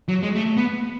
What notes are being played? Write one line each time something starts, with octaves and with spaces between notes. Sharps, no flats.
F#3
G#3
A3
B3